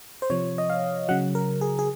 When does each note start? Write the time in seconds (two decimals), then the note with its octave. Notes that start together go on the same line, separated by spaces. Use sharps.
0.22 C5
0.30 C3 F3 C#5
0.58 D#5
0.70 F5
1.09 C#3 F#3 F#5
1.35 A#4
1.61 G#4
1.79 G#4